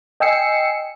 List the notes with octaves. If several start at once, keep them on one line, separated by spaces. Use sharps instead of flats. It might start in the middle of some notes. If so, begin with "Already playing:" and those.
D#5 G5 G#5 E6 C7 C#7